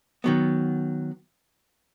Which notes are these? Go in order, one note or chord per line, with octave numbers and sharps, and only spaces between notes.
D#3 F#3 B3